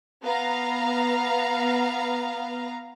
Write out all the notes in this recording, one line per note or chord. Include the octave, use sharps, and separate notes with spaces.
B3 F5 A#5